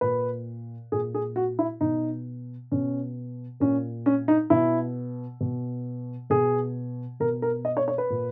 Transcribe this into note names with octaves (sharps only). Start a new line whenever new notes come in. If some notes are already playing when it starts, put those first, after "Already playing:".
A#2 B4
A#2 G#4
G#4
F#4
E4
B2 D#4
B2 C#4
A#2 C#4
C#4
D#4
B2 E4
B2
B2 G#4
B2 A#4
A#4
D#5
C#5
C#5
B4
A#2